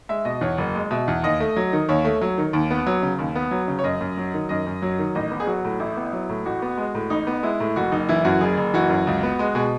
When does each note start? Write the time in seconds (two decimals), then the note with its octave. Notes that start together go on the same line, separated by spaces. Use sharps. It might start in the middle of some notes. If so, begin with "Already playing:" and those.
0.09 G#3 E5
0.25 B2 D#5
0.41 E2 C#5
0.58 F#1
0.75 G#3
0.91 B2 E5
1.08 E2
1.23 D#2 D#5
1.40 A3
1.57 F#3
1.73 D#3
1.89 D#2 C#5
2.05 A3
2.22 F#3
2.38 D#3
2.53 D#2
2.71 B3
2.87 F#3
3.02 C#3
3.19 D#2
3.35 B3
3.51 F#3
3.68 C#3
3.79 C#5
3.84 F#2 D#5
4.01 F#2
4.18 F#3
4.34 D#3
4.49 F#2 D#5
4.67 F#2
4.82 F#3
4.99 D#3
5.15 A1 D#5
5.31 B3
5.40 G#4
5.47 F#3 F#4
5.64 A2
5.80 A1 E4
5.97 B3
6.13 F#3
6.29 A2
6.46 A1 F#4
6.62 B3
6.77 G#3
6.95 A2
7.10 A1 D#4
7.27 B3
7.43 G#3 E4
7.60 A2
7.76 F#1 F#4
7.92 F#1 D#4
8.09 E3 E4
8.25 F#2 F#4
8.41 F#1 G#4
8.57 F#1
8.74 E3 F#4
8.90 F#2
9.07 C#2
9.23 B3
9.39 G#3
9.55 B2 G#4